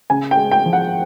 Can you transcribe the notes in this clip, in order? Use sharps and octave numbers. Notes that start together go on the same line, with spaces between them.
C#3 G#5
G5
G#3
G5
F3
F#5